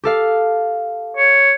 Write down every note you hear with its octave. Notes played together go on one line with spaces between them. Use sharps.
G4 A4 F5
C#5